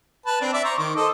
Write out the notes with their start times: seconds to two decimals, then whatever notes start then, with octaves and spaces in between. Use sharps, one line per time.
0.26 B4 A5
0.41 C4 D4
0.53 D5 E5
0.65 C5 A#5 C#6
0.79 D#3 D6
0.96 A4 C5 D#5